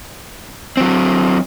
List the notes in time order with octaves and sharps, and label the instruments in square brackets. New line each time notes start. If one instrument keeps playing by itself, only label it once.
[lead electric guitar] F#3 C4